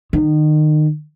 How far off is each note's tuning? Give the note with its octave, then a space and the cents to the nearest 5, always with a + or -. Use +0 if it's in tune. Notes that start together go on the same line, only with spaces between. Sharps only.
D#3 -30